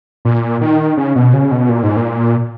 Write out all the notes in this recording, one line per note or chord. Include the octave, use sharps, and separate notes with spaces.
A#2
D#3
C#3
B2
C#3
B2
A#2
G#2
A#2